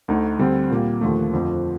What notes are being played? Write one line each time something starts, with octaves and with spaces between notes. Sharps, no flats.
D2 D3 A3 D#4
D2 D3 G3 C4
A#2 G3 A#3
D#2 D3 F3 A3
F2 D3 F3